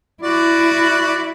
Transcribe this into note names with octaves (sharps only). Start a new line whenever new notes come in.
E4 F#4 D5